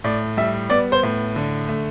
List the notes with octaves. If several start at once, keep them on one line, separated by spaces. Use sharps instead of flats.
A2 D5
G3 E5
B3 D5
C5
A2
D3
A3